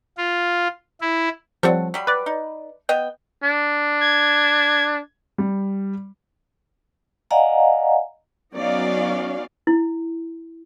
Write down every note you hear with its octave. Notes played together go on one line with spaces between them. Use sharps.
F4
E4
F3 G3 C4 A4 C#5 F#5
F#3 G3 B5
B4 D5
D#4
B3 D#5 G5
D4
G#6
G3
D5 D#5 F5 F#5 G#5 A#5
F#3 B3 C#4 D#4 D5 F5
E4